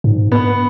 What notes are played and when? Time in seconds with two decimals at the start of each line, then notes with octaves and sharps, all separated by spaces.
0.04 G#2
0.32 B3